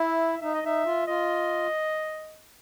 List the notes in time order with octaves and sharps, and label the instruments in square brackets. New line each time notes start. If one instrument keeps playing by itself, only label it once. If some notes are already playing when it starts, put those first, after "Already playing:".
Already playing: [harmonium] E4 [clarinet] E5
[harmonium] D#4 [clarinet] E5
[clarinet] D#5
[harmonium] D#4 [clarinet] E5
[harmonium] F4
[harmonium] F4 [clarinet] D#5